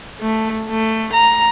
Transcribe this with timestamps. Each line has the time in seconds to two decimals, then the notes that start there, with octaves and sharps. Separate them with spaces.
0.20 A3
0.69 A3
1.13 A#5